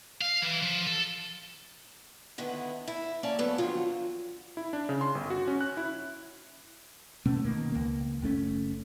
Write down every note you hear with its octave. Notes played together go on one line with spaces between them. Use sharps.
F5
E3
F3
A4
D3 D#3 B3 E4
E4
A#3 C#4 D5 A5
D2 F#3 B3 A4
D3 F3 F#3 C4 F4
E4
D4
C#3
C6
G1
F#4
C#4
F#6
E4
B2 A3 C#4
B2 D#3 A#3
C#2 A#3
F#1 A3 C#4